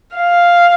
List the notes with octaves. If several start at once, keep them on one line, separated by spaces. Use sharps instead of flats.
F5